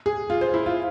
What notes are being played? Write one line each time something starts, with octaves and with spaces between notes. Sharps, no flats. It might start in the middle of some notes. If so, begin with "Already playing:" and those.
G#4
F4
C5
E4
F4